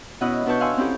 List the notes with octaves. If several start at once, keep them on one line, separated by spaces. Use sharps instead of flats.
B2 C#4 E4 D#5 F#5 F#6
B2 D4 B4 A5 C#6 G6
F5 F#5 G#5 C6 E6
C4 C#4 D#4 E4 G4 A4